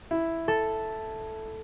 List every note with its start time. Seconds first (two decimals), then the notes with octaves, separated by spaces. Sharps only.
0.11 E4
0.48 A4